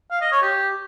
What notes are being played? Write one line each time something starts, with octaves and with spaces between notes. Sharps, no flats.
F5
D#5
C#5
G4